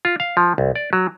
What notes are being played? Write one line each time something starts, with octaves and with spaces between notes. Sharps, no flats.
F4
F5
F3
C2
D5
F#3